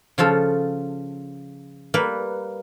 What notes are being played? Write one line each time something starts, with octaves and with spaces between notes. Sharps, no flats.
C#3 F3 F4 A4
G3 A#3 B4